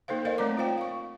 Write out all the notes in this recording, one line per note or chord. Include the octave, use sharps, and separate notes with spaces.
A#3 D#4 A4 C5 F5
A#4 C5 D5 D#5 F5
A3 C4 C#5 D5 A#5 D6
F4 C5 F5 G5
F5 C#6